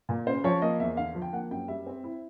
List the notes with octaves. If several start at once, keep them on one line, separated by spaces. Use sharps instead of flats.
A#2
C#3 C5
F3 C#5
A#3 D#5
E2 E5
D3 F5
F3
G5
A#3 F#5
F#2 G5
G3 E5
C4
E4